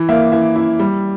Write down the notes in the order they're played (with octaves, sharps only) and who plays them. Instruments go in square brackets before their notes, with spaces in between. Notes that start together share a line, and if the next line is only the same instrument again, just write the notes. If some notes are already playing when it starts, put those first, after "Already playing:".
Already playing: [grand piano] E3
A#3 E5
E3 E5
E4
G3